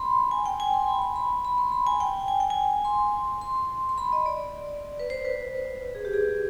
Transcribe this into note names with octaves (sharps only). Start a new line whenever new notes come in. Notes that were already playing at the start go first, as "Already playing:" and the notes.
Already playing: B5 C6
G#5
G5
G#5
C6
B5
C6
B5
B5
C6
B5
G#5
G5
G#5
G5
G#5
C6
C6
C6
B5
D#5
D5
B4
C5
B4
G#4
G4
G#4